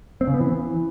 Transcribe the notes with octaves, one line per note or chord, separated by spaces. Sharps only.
C4
C#3
B3
E3